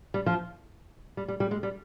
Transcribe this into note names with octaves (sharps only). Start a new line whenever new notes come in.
G3
F3
G3
G3
G3
G#3
G3